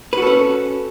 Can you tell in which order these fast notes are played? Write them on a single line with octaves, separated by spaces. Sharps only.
B4 F#4 A4 C#4